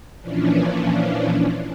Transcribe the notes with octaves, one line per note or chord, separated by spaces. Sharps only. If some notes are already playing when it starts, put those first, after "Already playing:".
A#2 E3 F3 C#4 D4